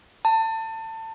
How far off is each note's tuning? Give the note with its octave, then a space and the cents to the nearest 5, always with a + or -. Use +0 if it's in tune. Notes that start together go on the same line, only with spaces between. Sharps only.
A5 +25